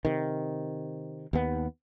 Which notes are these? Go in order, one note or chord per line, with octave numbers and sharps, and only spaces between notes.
C3 D#3
D#2 B3